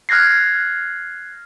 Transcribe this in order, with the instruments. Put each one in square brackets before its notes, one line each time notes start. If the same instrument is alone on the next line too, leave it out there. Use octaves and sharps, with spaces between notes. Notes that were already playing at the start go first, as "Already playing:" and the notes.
[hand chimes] F6 F#6 G#6 A#6 C7